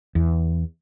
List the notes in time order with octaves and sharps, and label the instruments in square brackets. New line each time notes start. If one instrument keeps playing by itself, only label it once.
[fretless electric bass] E2